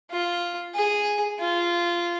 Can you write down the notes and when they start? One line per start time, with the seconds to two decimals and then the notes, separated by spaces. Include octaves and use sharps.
0.10 F4
0.74 G#4
1.40 F4